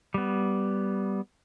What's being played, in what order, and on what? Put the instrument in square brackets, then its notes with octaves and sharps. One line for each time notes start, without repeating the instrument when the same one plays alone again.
[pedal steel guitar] G3 B3